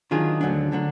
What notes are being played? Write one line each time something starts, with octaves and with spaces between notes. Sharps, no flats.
D#3 F#3 D4 F4 G#4
D2 D3 F#3 D4
D3 F#3 D4